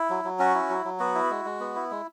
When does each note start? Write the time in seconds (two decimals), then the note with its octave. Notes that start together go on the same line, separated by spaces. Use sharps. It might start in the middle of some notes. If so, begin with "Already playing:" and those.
Already playing: E4
0.10 F#3
0.24 F#3
0.39 C#4 F#4
0.54 E4
0.70 F#3
0.85 F#3
0.99 B3 F#4
1.15 E4
1.30 G#3
1.45 G#3
1.60 B3
1.76 E4
1.91 G#3